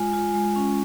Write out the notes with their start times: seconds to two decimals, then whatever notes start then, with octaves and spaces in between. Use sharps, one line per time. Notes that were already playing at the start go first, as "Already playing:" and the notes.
Already playing: G#3 F4 G#5
0.13 F4
0.34 G#3
0.56 C#4